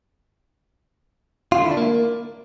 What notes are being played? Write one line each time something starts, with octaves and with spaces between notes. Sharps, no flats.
F4
D3
E4
D4
A#3